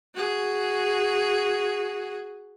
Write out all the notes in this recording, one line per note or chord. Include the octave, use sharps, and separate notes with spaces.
F#4 G#4